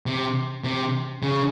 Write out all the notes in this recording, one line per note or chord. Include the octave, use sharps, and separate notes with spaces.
C3
C3
C#3